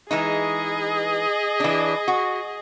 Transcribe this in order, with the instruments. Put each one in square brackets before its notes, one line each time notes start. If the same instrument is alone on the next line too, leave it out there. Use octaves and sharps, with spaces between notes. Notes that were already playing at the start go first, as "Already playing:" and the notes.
[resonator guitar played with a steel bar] E3 G#3 D#4 [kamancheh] G#4 D#5
[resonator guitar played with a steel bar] E3 D4
F#4